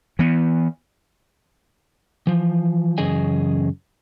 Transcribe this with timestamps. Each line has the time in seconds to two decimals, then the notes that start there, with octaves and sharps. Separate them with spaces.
0.19 E3 B3
2.27 E3 F3
2.98 F#2 C#3 E3 G#4 D#5 G#5